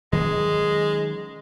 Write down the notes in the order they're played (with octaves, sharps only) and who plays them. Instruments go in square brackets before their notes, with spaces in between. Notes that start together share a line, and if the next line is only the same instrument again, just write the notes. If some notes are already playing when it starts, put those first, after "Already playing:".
[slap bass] D#3 F#3 C#4 [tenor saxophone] G#3